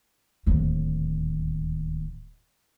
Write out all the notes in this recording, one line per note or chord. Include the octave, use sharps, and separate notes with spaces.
D1 D#2